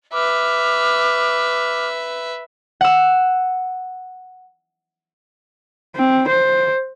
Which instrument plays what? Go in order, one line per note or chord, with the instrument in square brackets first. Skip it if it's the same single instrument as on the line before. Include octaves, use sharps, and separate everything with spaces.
[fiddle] B4 E5 [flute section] D6 F6
[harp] F#5 E6
[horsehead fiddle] C4
C5